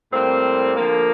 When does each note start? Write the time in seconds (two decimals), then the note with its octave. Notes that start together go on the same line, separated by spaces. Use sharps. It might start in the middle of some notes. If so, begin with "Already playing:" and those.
0.12 A2 G3 A#3 C4
0.76 D3 F3 A#3